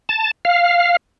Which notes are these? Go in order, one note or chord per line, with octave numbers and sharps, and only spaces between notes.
A5
F5